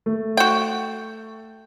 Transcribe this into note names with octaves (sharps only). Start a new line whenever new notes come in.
A3
F#4 G5